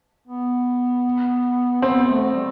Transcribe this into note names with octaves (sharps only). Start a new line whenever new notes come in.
B3
B3 C4
A3
G3